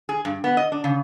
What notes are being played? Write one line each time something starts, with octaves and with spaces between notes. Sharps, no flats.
G#4
G2
B3
D#5
D4
C#3